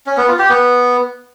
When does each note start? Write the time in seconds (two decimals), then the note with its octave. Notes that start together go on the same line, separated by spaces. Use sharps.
0.06 C#4
0.17 B3
0.28 F4
0.39 G4
0.50 B3